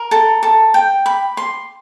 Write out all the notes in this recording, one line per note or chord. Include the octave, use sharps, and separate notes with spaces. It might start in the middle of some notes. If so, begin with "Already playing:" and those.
Already playing: A#4
A4
A4
G5
B5
C6